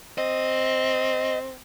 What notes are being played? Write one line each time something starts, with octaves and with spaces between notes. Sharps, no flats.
C4 D#5